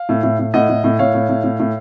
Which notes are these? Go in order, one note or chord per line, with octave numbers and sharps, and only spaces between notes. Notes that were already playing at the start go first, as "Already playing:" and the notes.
Already playing: F5
A2
A2
A2
A2 D#5 F#5
A2
A2
A2 C#5 F5
A2
A2
A2
A2